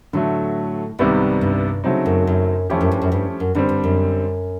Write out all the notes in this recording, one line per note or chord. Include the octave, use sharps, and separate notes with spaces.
A2 D3 F#3 A3
C2 G#2 C3 D#3 G3 B3
G2
C#3 F#3 A3 C4 D#4
F#2
F#2
F2 F3 A3 C#4 E4 G4
F#2
G2
F#2
G2
F#2
G2 D3 G3 C4
G2
F#2